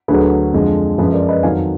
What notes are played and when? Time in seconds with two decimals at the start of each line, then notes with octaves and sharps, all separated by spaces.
0.08 D2 D3 F#3 G#4 B4
0.53 F2 D3 F3 G#3
0.98 F#2 F3 G#3 G#4 B4
1.14 A#4 D5
1.29 B4 D#5
1.43 F2 D#3 F#3 F5 G#5